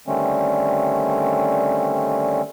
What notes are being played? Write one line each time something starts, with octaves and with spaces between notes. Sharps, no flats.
D3 D#3 G3 A3 C4 C#4